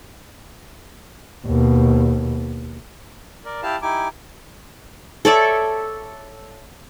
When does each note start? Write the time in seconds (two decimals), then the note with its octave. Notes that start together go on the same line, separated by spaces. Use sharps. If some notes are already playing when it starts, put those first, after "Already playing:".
1.46 D#2 B2
3.45 A#4 D5
3.63 E4 G4 F5 A5
3.82 D#4 E4 G4 G#5 D6
5.25 A4 C#5 D5 E5